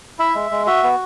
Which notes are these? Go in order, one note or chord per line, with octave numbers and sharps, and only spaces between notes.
E4 E5
G#3
G#3
F#4 E5
B3